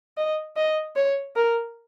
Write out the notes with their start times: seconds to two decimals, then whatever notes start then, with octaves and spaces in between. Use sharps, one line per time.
0.17 D#5
0.56 D#5
0.96 C#5
1.36 A#4